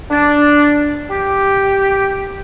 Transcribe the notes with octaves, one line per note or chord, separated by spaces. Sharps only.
D4
G4